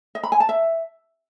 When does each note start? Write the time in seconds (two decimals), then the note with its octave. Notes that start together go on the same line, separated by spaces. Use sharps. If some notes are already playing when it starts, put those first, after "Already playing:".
0.15 D#5
0.23 B5
0.32 G#5
0.40 A5
0.49 E5